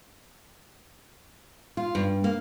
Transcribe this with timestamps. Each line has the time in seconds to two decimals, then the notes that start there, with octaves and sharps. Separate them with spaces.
1.77 F4
1.95 G2
2.24 A#3